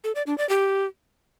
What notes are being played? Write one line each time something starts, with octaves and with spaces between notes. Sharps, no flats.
A4
D5
D4
D5
G4